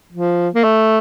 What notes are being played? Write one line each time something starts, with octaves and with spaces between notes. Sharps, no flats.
F3
A#3
A3